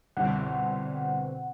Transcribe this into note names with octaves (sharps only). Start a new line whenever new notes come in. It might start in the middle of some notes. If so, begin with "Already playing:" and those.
G1 C2 B2 D3 C4 F#5